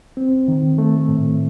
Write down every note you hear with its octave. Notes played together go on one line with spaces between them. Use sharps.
C4
D#3
A3
A2